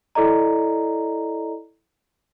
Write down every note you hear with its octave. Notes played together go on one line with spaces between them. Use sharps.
E4 A4 D5 D#5 A#5